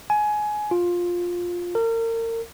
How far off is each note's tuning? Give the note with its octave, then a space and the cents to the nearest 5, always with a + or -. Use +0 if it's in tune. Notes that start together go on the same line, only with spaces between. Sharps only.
G#5 +20
F4 +10
A#4 -35